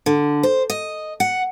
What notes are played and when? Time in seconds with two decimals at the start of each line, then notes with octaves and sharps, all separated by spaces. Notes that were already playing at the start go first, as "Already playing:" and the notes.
0.06 D3
0.43 C5
0.70 D#5
1.20 F#5